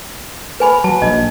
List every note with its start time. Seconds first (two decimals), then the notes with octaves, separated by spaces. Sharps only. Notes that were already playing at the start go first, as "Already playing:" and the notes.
0.60 B4 G#5 B5
0.84 F#3 A5
1.02 A#1 D#5